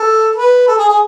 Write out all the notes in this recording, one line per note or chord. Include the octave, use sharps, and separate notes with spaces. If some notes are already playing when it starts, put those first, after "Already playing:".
Already playing: A4
B4
A4
G#4
G#4